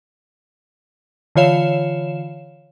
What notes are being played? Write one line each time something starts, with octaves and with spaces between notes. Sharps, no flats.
D3 E3 F4 C#5 F5 E7